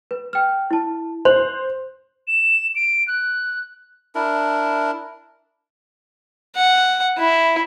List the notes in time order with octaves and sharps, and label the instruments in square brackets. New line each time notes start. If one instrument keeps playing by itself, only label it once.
[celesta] B4
G5 F6
E4 A5
[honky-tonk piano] C5 [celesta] F#6 F7 F#7
[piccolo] E7
D7
F#6
[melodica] D4 E4 A#4
[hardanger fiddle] F#5
E4